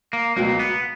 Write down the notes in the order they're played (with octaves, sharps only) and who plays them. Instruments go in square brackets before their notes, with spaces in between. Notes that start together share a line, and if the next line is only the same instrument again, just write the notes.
[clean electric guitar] A#3
[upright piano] C#2 B2 F#3 [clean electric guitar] A#3
[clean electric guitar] B3